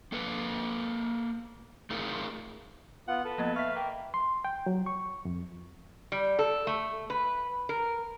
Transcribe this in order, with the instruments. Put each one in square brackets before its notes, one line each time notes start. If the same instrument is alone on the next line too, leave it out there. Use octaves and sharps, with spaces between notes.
[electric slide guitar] A#3 A4 B4
A3 D#4 F4 G#4 A#4
[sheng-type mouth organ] B3 F4 [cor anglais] F#5
[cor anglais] A4 [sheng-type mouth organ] B4
[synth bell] F3 A#3 B3 [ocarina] D#5
[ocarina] E5 [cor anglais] F5 [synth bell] C#6 B6
[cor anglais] A#3 [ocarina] G5
[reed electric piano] C6
G5
F#3
C#6
F2
[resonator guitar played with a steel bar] G3
A4
A3
B4
A#4